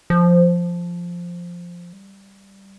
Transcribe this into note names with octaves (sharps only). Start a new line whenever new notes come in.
F3
G3